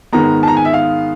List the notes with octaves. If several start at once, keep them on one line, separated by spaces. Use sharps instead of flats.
G#2 D#3 G#3 B3 A#5
A5
A#5
G#5
E5
F5